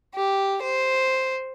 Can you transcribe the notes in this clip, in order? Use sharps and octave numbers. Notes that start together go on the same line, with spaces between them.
G4
C5